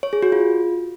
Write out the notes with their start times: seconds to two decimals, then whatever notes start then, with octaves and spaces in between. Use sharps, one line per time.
0.03 C#5
0.13 G#4
0.23 F#4
0.32 F4